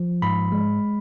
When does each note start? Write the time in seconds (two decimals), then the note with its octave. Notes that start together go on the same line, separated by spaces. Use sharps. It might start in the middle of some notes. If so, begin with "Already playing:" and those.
Already playing: F3
0.22 G#2 B5
0.52 G#3